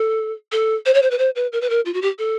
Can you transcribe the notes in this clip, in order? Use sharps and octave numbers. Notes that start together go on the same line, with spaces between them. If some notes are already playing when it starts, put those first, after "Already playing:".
Already playing: A4
A4
C5
C#5
C5
B4
C5
B4
A#4
B4
A#4
F4
F#4
G4
A4